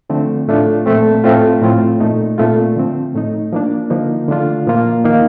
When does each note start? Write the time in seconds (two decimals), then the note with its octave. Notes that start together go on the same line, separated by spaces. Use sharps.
0.10 D3 F3 A3 C4
0.48 A2 A3 D4 F4
0.86 A#2 F3 A3 C4
1.24 A2 A3 C4 F4
1.62 A2 F3 C4 F4
2.00 A#2 A3 D#4
2.38 A#2 A3 C4 F4
2.76 D3 F3 C4
3.14 A2 A3 D#4
3.53 F3 A#3 D4
3.90 D3 F3 A#3 D#4
4.29 D3 A3 D4 F4
4.67 A#2 F3 A#3 F4
5.05 D#3 A#3 D#4